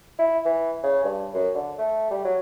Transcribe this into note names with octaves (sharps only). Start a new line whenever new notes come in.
E4
E3
C#3
G2
F#2
D3
A3
G3
F#3